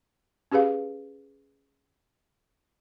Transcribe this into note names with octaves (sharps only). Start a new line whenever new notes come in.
C#4 G4 G#4 B4 F5